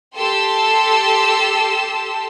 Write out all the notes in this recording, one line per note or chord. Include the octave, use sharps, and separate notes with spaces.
G4 A4 A5 C6 E6